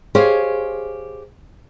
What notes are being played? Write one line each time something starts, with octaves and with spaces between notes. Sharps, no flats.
G4 G#4 C5 C#5 D#5 F5